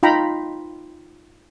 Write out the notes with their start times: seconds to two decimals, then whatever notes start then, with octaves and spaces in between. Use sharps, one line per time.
0.03 D#4 F4 G5 A#5 B5